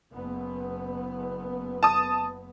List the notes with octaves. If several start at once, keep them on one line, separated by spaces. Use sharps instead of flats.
F#1 B3
A5 D#6